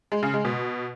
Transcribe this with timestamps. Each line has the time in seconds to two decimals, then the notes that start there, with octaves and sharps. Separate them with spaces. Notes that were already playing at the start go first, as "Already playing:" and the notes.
0.12 G#3
0.23 C#3
0.34 G#3
0.45 B2